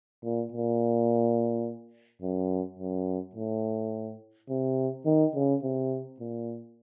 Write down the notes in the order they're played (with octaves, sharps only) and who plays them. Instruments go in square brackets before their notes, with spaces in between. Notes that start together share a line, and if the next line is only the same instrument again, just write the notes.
[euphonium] A#2
A#2
F#2
F#2
A2
C3
D#3
C#3
C3
A#2